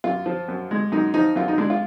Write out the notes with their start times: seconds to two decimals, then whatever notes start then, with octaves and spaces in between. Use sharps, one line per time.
0.04 F#2 F4
0.26 F3
0.48 F#2
0.71 G#3
0.92 F#2 D#4
1.14 F3 D#4
1.36 F#2 F4
1.48 D#4
1.58 G#3 D4
1.70 F4